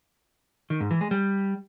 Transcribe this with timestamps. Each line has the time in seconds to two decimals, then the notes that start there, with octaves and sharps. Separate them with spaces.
0.70 D#3
0.80 G#2
0.91 E3
1.01 G#3
1.11 G3